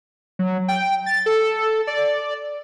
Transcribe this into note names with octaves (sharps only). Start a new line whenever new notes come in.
F#3
G5
A6
A4
D5